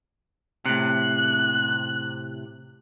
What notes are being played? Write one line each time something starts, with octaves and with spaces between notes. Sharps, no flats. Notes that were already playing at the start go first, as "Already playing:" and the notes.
A2 C3 F#6